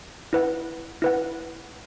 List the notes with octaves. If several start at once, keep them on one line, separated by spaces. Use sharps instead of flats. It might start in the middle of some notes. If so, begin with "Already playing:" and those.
E4 B4 F#5
E4 B4 F#5